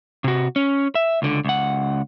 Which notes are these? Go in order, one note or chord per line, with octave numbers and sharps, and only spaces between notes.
C3 F#4
C#4
E5
C#2 D3
C#2 F#5